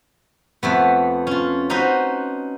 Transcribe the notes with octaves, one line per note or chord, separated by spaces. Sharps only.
F2 A3 B3
C#4 F4
C#4 D#4 F#4 B4 C5